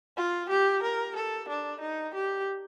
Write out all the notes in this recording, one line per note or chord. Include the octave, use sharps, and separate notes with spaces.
F4
G4
A#4
A4
D4
D#4
G4